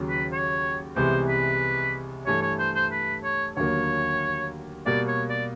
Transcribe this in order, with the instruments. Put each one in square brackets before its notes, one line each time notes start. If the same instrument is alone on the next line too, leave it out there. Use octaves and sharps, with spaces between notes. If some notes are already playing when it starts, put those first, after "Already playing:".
Already playing: [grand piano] D#2 C#3 F#3
[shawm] B4
C#5
[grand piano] C2 C3 E3 G#3 B3 [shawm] C5
[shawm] B4
[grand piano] G2 E3 A3 [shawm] C#5
[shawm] C#5
C5
C5
B4
C#5
[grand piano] D#2 D3 F#3 A#3 [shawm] C#5
[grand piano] B2 G3 A#3 [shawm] D5
[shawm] C#5
D5